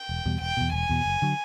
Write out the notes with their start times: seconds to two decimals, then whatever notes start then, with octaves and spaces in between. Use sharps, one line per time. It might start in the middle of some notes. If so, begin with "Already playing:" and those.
Already playing: G5
0.09 E1
0.26 E2 B2 G3
0.41 E1 G5
0.57 E2 B2
0.73 E1 G#5
0.89 E2 B2
1.05 F#1
1.22 D3 F#3